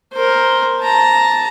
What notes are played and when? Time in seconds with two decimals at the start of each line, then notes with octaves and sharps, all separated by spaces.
0.13 A#4 C5
0.81 A5 A#5